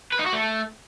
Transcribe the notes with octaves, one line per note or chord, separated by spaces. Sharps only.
B4
D#4
F#4
A3